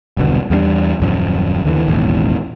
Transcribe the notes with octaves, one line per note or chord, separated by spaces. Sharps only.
E1 C2 B2 D3
E2 G3 A3 D4
D#1 F#2 F3
D#2 D3 E3
E1 A1 D#2